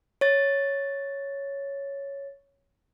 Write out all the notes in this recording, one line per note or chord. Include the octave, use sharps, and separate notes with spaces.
C#5 A6